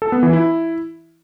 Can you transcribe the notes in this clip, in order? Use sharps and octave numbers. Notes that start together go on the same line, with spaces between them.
A4
B3
E3
E4